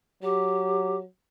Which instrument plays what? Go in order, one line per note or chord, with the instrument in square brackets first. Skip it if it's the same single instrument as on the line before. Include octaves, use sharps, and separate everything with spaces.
[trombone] F#3 [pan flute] G4